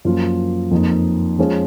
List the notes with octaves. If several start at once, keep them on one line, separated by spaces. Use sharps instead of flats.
F#2 F3 A#3 F4
F2 F3 A#3 D#4
F3 G#3 C#4